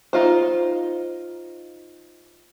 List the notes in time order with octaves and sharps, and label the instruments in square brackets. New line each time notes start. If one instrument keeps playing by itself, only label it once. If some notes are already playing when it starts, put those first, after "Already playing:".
[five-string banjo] D#4 F4 C5